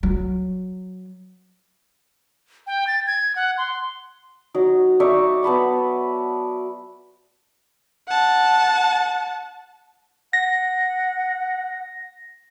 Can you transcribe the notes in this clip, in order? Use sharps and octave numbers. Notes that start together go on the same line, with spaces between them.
F#3
G5
A6
G#6
F#5
C6
F#3 D#4
D#4 D5 E5 C#6
B3 A5 B5 E6
F#5 A5
F#5 A#6